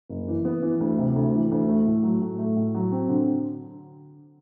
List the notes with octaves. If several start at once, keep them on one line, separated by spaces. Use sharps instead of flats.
F#1
E3
B3
E3
D2
C3
D2
E3
D2
A3
A2
F#3
A2
A3
A2
F#3
C4
D3